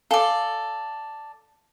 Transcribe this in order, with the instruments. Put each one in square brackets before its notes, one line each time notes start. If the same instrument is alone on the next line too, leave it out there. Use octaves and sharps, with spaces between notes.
[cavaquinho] A4 D5 [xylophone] F5 G#5